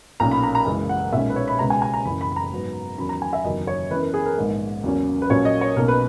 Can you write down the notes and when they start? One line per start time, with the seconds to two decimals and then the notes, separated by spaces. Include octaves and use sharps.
0.20 B1 A#2 A#3 C#4 A#5
0.31 B5
0.43 A#5
0.55 A#5
0.66 F#1 F#2 E3 G#3
0.89 F#5
1.12 B1 A#2 G#3 C#4 E5
1.30 B4
1.36 C#5
1.48 B5
1.59 C#2 B2 G#3 B3 A#5
1.70 G#5
1.82 G#5
1.94 A#5
2.05 F#1 F#2 E3 B5
2.21 B5
2.32 B5
2.36 A#5
2.51 G#2 F#3 B3
2.98 E2 D#3 F#3 C#4 B5
3.09 A#5
3.22 G#5
3.33 E5
3.44 F#1 E2 D#3 F#3 D#5
3.67 C#5
3.91 F#2 E3 B3 B4
4.02 A#4
4.14 G#4
4.26 A#4
4.37 A#1 G#2 D#3 G#3 B3
4.84 E2 C#3 F#3 A#3 C#4
5.22 B4
5.30 A#1 A#2 F#3 A#3 C#4 C#5
5.45 D#5
5.61 C#5
5.76 B1 B2 A#3 C#4 A#4
5.88 B4